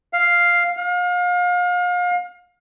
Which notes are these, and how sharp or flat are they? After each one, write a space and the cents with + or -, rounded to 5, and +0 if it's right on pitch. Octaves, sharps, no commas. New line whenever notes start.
F5 +0
F5 +35